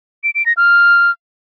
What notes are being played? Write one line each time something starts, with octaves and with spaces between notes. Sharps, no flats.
D7
D7
A#6
F6